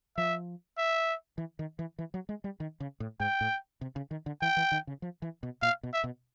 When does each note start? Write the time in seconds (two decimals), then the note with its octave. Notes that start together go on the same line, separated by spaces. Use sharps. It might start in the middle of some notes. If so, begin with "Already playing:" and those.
0.17 F3 E5
0.78 E5
1.38 E3
1.59 D#3
1.79 E3
1.99 E3
2.14 F#3
2.29 G#3
2.44 G3
2.60 D#3
2.80 C#3
3.00 A2
3.20 G#2 G5
3.41 A2
3.81 C3
3.96 C#3
4.11 D#3
4.26 D3
4.42 E3 G5
4.57 E3
4.72 D#3
4.87 C#3
5.02 F3
5.22 E3
5.43 B2
5.62 A#2 F5
5.83 B2
5.93 E5
6.04 B2